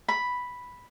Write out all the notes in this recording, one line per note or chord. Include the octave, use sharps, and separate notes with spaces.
B5